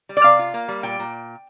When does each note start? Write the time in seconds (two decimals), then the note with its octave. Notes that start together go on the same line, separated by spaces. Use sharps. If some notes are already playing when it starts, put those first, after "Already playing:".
0.09 G3
0.17 D5
0.24 C3 F5
0.39 F4
0.54 A#3
0.68 G3
0.83 A#2 G5
0.99 A#2